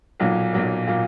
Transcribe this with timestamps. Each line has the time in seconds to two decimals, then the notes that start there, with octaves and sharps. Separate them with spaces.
0.20 B1 A#2 F#3 A#3
0.53 B1 A#2 F#3 A#3
0.87 A#2 F#3 A#3